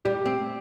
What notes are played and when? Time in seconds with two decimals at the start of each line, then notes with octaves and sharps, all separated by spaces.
0.05 G3 G4
0.25 C4